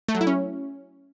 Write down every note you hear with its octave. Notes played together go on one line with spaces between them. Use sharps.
A3
F#3
E4
C#4